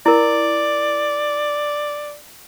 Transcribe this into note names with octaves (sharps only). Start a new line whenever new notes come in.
E4 A#4 D5